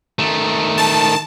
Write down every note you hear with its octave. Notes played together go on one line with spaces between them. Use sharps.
D#3 A3
A5